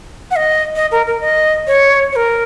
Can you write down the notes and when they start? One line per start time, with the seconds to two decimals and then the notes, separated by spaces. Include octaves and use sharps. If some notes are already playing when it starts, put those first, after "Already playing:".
0.31 F#5
0.36 D#5
0.76 D#5
0.92 A#4
1.07 A#4
1.21 D#5
1.67 C#5
2.12 C#5
2.16 A#4